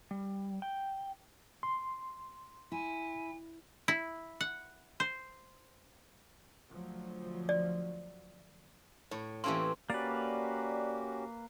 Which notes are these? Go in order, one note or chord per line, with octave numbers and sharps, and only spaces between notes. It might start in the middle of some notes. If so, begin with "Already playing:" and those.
G3
G5
C6
E4 G#5
E4
F#5
C5
D2 F3 F#3
D5
A2 C#5
E3 A3 A#3 C4 C#4 G4 C6
A#3 C#4 F#4 G4 B4 D5